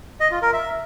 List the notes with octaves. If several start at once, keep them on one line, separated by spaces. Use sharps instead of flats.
D#5
F4
A#4
E5